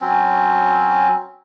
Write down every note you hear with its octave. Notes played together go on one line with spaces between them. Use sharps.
F#3 C4 C#4